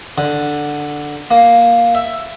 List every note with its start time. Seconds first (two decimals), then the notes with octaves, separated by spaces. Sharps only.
0.18 D3
1.31 A#3
1.95 E5